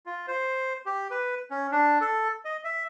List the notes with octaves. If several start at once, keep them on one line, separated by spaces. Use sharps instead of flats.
F4
C5
G4
B4
C#4
D4
A4
D#5
E5